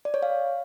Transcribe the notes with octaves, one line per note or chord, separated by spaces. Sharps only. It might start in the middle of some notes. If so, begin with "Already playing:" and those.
D5
C#5
F5